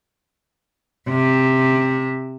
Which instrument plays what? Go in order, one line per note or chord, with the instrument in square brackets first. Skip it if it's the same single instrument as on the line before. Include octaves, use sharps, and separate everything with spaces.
[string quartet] C3